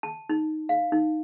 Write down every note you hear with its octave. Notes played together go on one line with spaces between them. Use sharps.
A5
D#4
F5
D#4